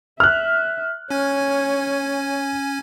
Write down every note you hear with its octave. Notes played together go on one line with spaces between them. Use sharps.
E5 F6 F#6
C#4 C#5 G#5 G#6